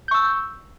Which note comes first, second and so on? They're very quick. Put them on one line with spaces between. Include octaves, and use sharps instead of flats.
G6 C#6 E6